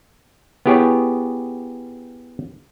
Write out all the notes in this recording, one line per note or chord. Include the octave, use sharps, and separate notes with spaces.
B3 E4 G4 G#4 C#5